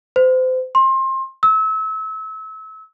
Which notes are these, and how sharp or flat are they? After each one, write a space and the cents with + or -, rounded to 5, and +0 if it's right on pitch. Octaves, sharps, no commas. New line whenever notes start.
C5 -30
C6 +25
E6 -30